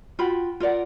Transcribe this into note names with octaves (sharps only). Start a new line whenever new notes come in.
F4 F#4 G5 B5
F4 A#4 D5 F#5